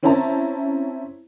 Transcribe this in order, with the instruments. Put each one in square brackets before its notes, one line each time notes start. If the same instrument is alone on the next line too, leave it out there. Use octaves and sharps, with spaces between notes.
[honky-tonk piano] C4 C#4 E4 C5 A5 A#5